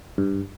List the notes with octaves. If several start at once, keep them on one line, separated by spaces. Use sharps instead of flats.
G2